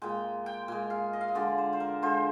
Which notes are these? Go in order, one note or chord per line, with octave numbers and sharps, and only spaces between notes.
A#2 G#3 G5
G5
A#2 G#3 G#5
F5
D#5
F5
D#5
D3 F3 G#3 D5
C5
C5
A#4
D3 F3 G#3 C5